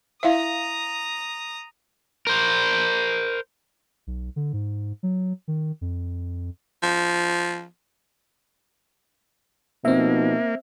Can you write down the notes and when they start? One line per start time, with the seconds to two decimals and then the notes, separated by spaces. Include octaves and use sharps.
0.23 E4 A#4 E5 F5 A#5 D#6
2.27 A#4 C5
4.07 B1
4.36 D3
4.53 G#2
5.03 F#3
5.48 D#3
5.81 F2
6.83 F3
9.85 B2 F3 A#3 C4 D#4 E5